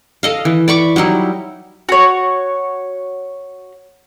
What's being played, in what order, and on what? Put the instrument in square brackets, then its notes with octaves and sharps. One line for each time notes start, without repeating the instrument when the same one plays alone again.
[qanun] A4 D#5 F5
E3
D5 B5 C#6 D6
F#3 G3 D#4 E4
[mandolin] F#4 C#5